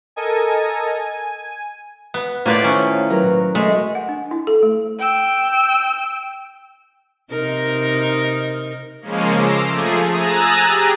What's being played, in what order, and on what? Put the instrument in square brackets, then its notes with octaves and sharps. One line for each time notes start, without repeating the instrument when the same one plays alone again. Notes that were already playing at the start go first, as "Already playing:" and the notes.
[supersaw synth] A4 A#4 D#5 G#5
G#5
[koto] B3
[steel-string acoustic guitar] A2 F4 [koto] A#3 B4 D5 [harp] C5
[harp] D#3 [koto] C#4
[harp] F#3 A#4 [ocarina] B4
[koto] G#3 [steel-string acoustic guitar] A3 [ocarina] D#5
[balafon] F#5
D4
E4
A4
A3
[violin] G5 E6
[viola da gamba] C3 D#4 A#4
[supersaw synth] C#3 F3 G#3 A#3 C#4
A#5 C6 D6 E6
F3 A3 G#4
G#5 A#5 D#6 E6 F#6 A6
G4 G#4